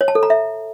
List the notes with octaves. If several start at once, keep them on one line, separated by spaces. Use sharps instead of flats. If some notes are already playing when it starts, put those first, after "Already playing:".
C#5
A5
A4
A#5
E5